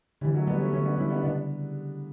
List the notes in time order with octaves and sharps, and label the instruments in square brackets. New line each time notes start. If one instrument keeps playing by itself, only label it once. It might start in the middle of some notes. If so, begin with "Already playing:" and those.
[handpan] D3 [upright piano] E3 G3
[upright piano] F#3 A3
[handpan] G3 [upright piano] B3 D4
[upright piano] A3 C#4
[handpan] D3 [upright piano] A3 C#4
[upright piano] B3 D4
[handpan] G3 [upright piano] C#4 E4
[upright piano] B3 D4
[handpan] C#3 [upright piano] B3 D4